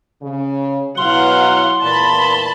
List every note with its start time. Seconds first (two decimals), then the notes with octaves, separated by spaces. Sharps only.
0.22 C#3
0.97 B2 F#3 E4 F5 F#5 C6
1.82 E2 A#2 A5 B5